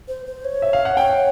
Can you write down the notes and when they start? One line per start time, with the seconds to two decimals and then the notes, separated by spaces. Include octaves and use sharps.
0.08 C5
0.26 C5
0.45 C#5
0.62 E5
0.73 F5
0.85 F#5
0.97 C#5 G5